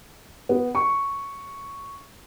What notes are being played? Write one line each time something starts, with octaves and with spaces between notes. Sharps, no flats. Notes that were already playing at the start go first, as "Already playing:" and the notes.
B3
C#6